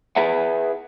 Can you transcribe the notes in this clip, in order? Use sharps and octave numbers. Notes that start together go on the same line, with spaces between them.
E4 G#4 B4 E5 F#5